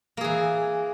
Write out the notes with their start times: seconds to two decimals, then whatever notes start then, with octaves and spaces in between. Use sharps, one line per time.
0.17 A#3
0.21 G#4
0.24 E3